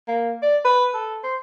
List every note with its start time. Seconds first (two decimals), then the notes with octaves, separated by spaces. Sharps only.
0.08 A#3
0.43 D5
0.65 B4
0.94 A4
1.23 C5